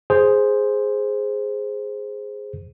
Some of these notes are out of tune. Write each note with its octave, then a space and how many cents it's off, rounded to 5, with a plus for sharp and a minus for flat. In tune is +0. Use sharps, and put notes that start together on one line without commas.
G#4 +0 C5 +0